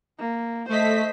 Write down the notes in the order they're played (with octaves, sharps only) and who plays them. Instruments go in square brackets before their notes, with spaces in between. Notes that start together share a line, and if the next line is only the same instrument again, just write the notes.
[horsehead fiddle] A#3
[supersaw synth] A3 B6 [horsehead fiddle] C5 D#5